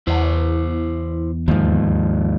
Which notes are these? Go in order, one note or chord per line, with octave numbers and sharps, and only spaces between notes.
E2 E4 C5
D#2 G#2 F3